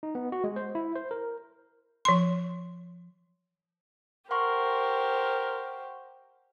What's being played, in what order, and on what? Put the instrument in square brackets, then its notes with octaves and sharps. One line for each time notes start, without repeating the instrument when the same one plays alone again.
[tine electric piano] D#4
B3
F#4
G#3
C5
E4
C5
A#4
[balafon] F3 C6
[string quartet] G4 C5 [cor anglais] A#4 [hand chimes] F#5 C6 C#6